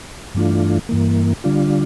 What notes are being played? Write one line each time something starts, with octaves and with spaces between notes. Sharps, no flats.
G2 E3 A3 D4 F4
G2 E3 A#3
D3 G3 D4 F4